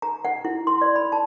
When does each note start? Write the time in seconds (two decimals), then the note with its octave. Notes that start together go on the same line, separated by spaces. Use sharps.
0.02 A#5
0.25 F#5
0.45 E4
0.67 C6
0.81 D5
0.96 B5
1.12 A5